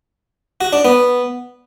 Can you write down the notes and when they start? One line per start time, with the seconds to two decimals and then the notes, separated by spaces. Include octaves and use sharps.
0.61 F#4
0.73 D4
0.85 B3